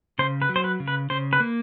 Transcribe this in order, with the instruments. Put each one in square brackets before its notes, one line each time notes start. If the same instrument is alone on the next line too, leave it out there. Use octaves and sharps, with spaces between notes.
[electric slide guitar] C#3 [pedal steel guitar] C5
[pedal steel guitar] B4
[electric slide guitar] F#3
[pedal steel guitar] C5
B4
[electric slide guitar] C#3
[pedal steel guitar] B4
[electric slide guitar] C#3 [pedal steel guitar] C5
[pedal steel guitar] B4
[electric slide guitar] A#3